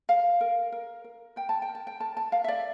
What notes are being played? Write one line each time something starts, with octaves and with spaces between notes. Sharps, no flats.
A#4 F5
A#4
A#4
A#4
A#4 G5
A5
G5
A#4
A5
G5
A#4 A5
A5
A#4 F5
E5
D5